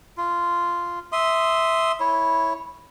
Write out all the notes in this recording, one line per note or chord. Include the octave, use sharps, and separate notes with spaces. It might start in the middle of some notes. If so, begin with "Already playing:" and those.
F4
E5 C6 D#6
E4 C#5